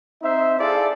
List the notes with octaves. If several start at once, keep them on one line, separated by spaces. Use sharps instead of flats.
C4 D#4 C5 E5
E4 G#4 A4 D5 F5